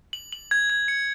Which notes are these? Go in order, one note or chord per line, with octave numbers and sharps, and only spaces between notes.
F#7
F#7
G#6
G#6
C#7